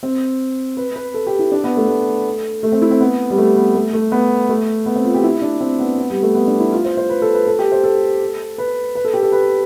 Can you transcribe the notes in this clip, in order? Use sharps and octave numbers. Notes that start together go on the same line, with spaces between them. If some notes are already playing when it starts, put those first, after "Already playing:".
C4
B4
B4
A4
G4
E4
D4
B3
A3
A3
A3
C4
E4
C4
B3
G3
A3
B3
A3
A3
B3
A3
B3
C4
F4
G4
E4
D4
C4
B3
B3
G3
A3
B3
D4
E4
F4
C5
C5
B4
A4
B4
A4
G4
C5
A4
B4
B4
A4
G4
A4
B4